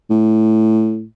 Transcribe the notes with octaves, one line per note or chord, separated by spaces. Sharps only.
A2